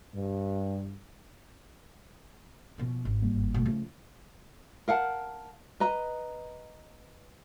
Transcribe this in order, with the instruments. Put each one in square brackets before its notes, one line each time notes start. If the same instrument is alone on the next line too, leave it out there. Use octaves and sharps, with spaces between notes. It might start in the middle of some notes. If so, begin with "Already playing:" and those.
[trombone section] G2
[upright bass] B2 F3
G#1
[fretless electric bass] G1 G3 A#3
[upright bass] B2 A3
[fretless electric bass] C#3 A3 [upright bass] F3
[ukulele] A#4 F5 F#5 A5
B4 D#5 A#5